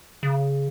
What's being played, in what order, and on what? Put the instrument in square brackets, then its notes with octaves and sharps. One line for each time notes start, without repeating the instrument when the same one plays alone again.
[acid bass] C#3